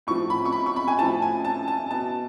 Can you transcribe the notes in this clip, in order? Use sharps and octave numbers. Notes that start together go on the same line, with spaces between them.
A2 F3 C#6
B5
C#6
B5
C#6
B5
G#5
A2 F3 A5
G#5
A5
A5
B2 A5